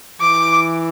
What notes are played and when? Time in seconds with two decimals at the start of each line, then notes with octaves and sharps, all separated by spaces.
0.21 E3 D6